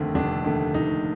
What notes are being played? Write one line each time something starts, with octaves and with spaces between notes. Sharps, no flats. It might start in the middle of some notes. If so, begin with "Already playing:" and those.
Already playing: F1 D#2 D3 A3 C4
F1 D4
D#2 D3 A3
F1 D#4